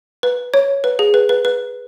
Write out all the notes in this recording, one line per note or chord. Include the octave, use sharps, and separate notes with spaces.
B4
C#5
B4
G#4
B4
B4
B4